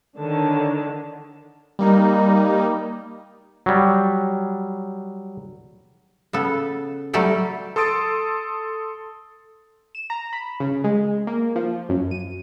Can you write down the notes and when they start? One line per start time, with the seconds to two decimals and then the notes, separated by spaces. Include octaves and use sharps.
0.17 D3 D#3 D4 C#5 A5
1.79 G3 A#3 D#4
3.66 F#3 G3
6.33 C#3 B3 A4
7.13 F#3 G3 A3 G4 A4 D5
7.76 A4 C6 D#6 A6 D7
9.95 E7
10.10 A#5
10.33 B5
10.60 C#3
10.84 G#3
11.27 A#3
11.56 F3
11.89 F#2
12.11 D#7